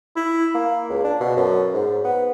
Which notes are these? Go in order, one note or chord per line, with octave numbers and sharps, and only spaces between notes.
E4
A#3
C#2
D4
B2
F#2
G#2
B3